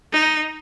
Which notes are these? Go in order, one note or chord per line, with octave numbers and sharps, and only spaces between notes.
D#4